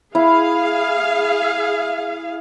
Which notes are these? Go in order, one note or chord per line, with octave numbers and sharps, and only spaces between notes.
E4 G#4 F5